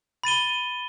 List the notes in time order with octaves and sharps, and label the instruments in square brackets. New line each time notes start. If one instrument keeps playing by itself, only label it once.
[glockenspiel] B5 A6 D#7 G7